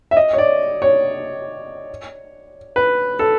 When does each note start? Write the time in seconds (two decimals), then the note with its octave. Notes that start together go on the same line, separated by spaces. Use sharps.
0.11 E5
0.17 D#5
0.33 C#5
0.38 D5
0.82 C#5
2.76 B4
3.19 A4